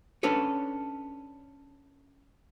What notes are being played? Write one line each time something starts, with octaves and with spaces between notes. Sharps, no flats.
C#4 D4 A4 B4 C#5